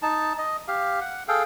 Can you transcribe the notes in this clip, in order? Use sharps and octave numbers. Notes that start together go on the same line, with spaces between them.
D#4 A5
D#5
G4 F5
F#5
G#4 A4 F5 G5